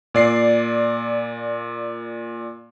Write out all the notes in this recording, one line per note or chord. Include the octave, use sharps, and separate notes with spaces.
A#2 D5 C7